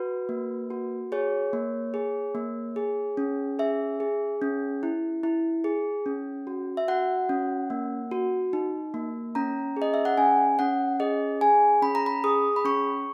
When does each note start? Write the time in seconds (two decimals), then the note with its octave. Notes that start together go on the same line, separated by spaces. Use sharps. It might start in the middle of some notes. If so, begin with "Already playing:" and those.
Already playing: F#4 B4
0.29 A#3
0.70 F#4
1.12 G#4 C#5
1.53 A#3
1.94 G#4
2.35 A#3
2.76 G#4
3.17 C#4
3.59 G#4 E5
4.00 G#4
4.42 C#4
4.83 E4
5.23 E4
5.64 G#4
6.06 C#4
6.47 F#4
6.77 E5
6.88 F#4 F#5
7.29 C#4
7.70 A#3
8.11 F#4
8.53 D#4
8.94 A#3
9.35 C#4 A#5
9.77 G#4
9.82 D#5
9.94 E5
10.05 F#5
10.17 C#4 G#5
10.59 C#4 F#5
11.00 G#4 D#5
11.41 G#4 G#5
11.82 C#4 B5
11.95 A#5
12.06 B5
12.24 G#4 D#6
12.56 B5
12.65 C#4 C#6